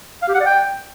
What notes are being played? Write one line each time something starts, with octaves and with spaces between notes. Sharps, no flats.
F5
G4
F#5
D5
G5